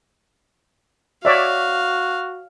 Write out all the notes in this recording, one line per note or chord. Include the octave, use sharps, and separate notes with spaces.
F#4 C#5 D5 E5 F5